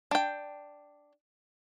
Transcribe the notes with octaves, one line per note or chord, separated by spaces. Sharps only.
D4 G5